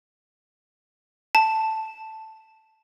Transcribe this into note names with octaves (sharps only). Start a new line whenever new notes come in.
A5